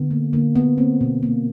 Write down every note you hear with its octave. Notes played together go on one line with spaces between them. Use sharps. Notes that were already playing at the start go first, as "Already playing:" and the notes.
Already playing: D3 B3
A#3
D3 A#3
A#3 B3
A#3 C4
B2
A#3